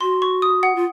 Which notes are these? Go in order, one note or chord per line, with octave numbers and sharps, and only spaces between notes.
F#4 C6
C#6
D#6
F#5
F4